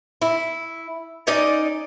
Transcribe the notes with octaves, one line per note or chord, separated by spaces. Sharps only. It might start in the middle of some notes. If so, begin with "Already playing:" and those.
E4
C#4 D#4 D5 D#5